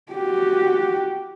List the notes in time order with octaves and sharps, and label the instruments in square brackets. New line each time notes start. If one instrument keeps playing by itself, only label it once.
[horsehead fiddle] F#4 G4